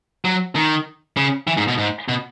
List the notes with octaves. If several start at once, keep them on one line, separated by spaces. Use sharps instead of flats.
F#3
D#3
C#3
E3
G#2
B2
G#2
B2